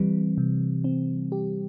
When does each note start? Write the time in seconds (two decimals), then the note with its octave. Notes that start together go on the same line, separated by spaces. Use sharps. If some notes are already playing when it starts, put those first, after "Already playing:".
Already playing: E3 G3 C4
0.38 C3
0.84 C4
1.32 G4